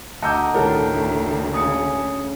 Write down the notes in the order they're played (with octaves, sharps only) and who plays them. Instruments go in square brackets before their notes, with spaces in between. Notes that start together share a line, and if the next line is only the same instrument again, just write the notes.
[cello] D2 [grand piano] D#5 E6 G6 [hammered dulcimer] F#5 [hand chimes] A5 A#5 D6
[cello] D2 A2 [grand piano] D#3 A4 A#4 [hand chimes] E4 C#5
[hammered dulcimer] C#3 [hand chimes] D#6 C#7